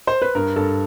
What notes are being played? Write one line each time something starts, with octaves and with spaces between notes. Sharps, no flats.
C5
B4
G2 A#4
G2 A4